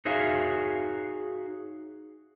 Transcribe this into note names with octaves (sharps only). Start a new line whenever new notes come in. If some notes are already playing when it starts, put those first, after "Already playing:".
D#4 F#4 G#4 C#5 E5 F5